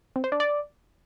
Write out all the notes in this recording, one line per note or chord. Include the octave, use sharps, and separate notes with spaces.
C4
C5
D4
D5